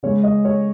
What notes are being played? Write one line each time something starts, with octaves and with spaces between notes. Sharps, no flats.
C#3 G#3 C#4 C#5
D#5
C#5